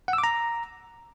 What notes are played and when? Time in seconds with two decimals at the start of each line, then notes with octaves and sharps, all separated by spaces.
0.08 F#5
0.13 E6
0.18 D6
0.24 A#5